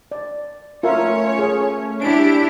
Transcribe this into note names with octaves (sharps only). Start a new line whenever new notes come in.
D5
A3 C#4 F4 A#4 C#5 E5
G#4
D4 E4 G4 D7